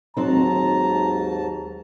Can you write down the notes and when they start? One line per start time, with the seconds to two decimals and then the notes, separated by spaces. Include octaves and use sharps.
0.17 D#2 G#2 F#3 C4 D#4 A5 A#5